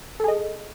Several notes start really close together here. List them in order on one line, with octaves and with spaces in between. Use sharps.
A4 G#4 D#5